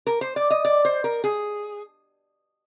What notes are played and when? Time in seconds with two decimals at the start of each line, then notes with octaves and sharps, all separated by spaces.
0.07 A#4
0.21 C5
0.36 D5
0.50 D#5
0.65 D5
0.85 C5
1.04 A#4
1.24 G#4